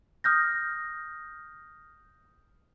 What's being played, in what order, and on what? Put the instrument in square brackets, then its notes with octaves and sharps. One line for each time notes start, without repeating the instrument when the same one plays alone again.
[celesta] D#6 F6 G6 A#6